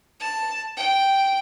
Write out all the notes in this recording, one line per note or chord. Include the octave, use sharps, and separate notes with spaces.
A5
G5